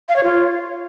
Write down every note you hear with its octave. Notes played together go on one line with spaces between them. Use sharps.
F5
C#5
F4